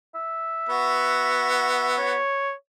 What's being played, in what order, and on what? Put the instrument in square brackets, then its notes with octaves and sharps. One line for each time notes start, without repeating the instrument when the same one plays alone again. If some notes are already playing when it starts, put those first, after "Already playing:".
[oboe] E5
[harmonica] B3 F#4
[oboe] C#5